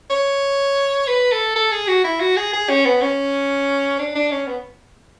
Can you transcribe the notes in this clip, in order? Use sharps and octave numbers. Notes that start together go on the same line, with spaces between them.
C#5
B4
A4
A4
G#4
F#4
E4
F#4
G#4
G#4
C#4
B3
C#4
D4
D4
C#4
B3